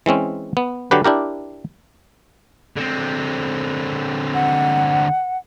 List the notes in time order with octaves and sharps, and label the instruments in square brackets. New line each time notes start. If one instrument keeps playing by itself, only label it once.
[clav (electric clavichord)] E3 G#3 C4 C#4
B3
D3 F#3 G4 B4
D4 E4 G4 A#4
[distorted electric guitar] D3 C4
[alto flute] F#5